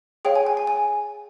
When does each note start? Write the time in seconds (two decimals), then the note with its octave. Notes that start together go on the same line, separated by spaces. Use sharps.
0.25 G#4 C#5 F5 G5
0.36 G#5
0.46 G#5
0.57 G#5
0.67 G#5